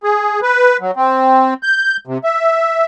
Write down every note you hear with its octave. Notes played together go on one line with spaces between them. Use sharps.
G#4
B4
F#3
C4
G6
C3
E5